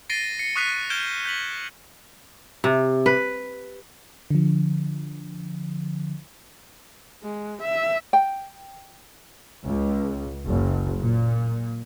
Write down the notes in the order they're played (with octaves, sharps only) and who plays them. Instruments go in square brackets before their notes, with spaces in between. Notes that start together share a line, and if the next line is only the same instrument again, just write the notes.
[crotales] A6 A#6 C7 D7 D#7 G7
C7 C#7
C#6 D#6 F#6 B6 C7 D#7
F6 G6 G#6 D7 E7 G7
G6 B6 F#7
[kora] C3
B4
[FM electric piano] D3 F3
[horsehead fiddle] G#3
E5
[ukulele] G5
[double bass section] C#2
F#1
A#2